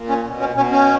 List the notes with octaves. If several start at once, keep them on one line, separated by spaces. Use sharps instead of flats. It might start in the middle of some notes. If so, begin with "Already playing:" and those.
Already playing: A#2
C#4
B2
C#4
B2 C#4
C#4